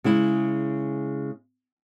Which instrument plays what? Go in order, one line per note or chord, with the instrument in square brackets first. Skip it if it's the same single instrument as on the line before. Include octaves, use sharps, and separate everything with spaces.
[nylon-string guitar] C#3 G#3 E4